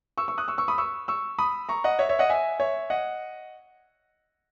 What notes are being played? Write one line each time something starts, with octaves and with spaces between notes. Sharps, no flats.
C#6 E6
C#6 E6
D#6 F#6
C#6 E6
C#6 E6
B5 D#6
C#6 E6
C#6 E6
B5 D#6
A#5 C#6
D#5 F#5
C#5 E5
C#5 E5
D#5 F#5
E5 G#5
C#5 E5
D#5 F#5